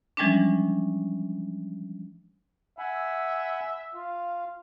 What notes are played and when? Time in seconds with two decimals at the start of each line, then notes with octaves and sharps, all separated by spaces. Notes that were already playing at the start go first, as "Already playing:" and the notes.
0.17 E3 F3 G3 G#3 C#4 D4
2.79 E5 F#5 G#5 B5
3.95 F4 F5